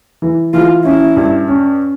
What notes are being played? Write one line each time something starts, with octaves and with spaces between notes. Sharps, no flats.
E3
E3 F4
C#4 E4
G2
C#4